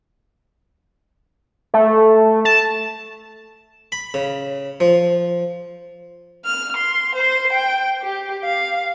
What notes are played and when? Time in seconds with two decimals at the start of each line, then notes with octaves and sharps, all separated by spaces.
1.74 A3
2.45 A5
3.92 B5
4.14 C#3
4.80 F3
6.45 F6
6.76 C6
7.15 C5 C6
7.52 G5
8.02 G4
8.44 F5